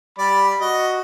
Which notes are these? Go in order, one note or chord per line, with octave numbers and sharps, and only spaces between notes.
G3 D5 B5
F#4 D#5